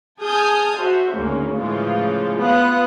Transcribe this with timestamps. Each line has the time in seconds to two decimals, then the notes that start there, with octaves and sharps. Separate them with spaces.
0.20 G#4 G#5 A5 D#6 F6 G6
0.77 F#4 C5 E5
1.12 D2 G#2 C#3 A#3 C#4
1.55 A2 C#3 E3 F3 G#3 F4
2.38 B3 F4 B4 D#6 F#6